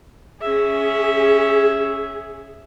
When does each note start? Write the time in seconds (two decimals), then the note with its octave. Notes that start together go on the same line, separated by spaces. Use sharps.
0.41 C#4 G#4 E5